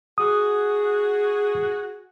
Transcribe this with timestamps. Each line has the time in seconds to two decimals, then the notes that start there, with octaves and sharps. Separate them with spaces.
0.18 F#4 G#4 D#6